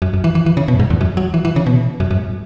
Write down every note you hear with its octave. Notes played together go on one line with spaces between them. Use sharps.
F#2
F#2
E3
E3
E3
C#3
B2
F#2
G#2
E2
F#2
F#3
E3
E3
C#3
B2
F#2
F#2
G#2